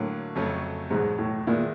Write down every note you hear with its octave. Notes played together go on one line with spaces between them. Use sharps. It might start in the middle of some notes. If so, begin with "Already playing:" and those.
Already playing: A2 D3 F#3 A#3
F2 C#3 F#3 A3 C#4
E2 G#2 B2 F#3
A2
A#2 D#3 G#3 B3 E4 G#4